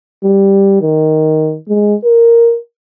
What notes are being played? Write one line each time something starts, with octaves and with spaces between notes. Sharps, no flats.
G3
D#3
G#3
A#4